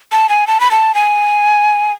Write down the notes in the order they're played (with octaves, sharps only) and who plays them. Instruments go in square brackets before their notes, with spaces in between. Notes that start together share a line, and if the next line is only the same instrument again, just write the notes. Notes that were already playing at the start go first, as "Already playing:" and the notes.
[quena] A5
G#5
A5
B5
A5
G#5